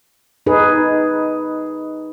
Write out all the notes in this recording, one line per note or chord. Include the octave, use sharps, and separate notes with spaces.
D#4 G#4 B4